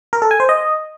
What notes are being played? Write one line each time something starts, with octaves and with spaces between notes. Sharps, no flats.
A#4
A4
G#5
C5
D#5